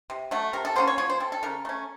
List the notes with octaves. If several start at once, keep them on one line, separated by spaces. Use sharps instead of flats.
C3
F#3 A3
C3 A#4
A4
F#3 A#3 C#4 C5
C#5
F3 C#5
C5
C4 A4
A4
C#3 A#4
A3 C#4